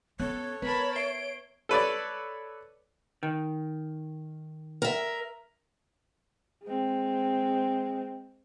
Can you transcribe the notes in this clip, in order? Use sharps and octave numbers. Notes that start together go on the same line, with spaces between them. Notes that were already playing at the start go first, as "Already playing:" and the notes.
B3 C#4 A4 C#5 F#6
B3 A#4 B4 A5 B5
E5 C7 D7 G7
A4 B4 C#5 D5
D#3
A#4 E5
G#3 C4